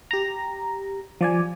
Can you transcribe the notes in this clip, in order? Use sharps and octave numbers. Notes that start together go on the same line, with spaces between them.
G4 A#5
F3 D5 G#5